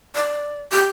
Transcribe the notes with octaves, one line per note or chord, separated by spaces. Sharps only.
D5
G4